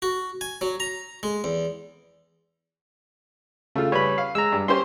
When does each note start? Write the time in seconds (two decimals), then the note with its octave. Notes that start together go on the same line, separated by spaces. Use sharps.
0.02 F#4
0.41 G#5
0.61 F#3
0.80 A#5
1.23 G#3
1.44 E2
3.76 C#3 A3 F4
3.92 C#3 G3 B4 C#5 B5
4.18 F5
4.35 G#3 A#5 E6
4.52 G2
4.68 C#4 G4 C5 C6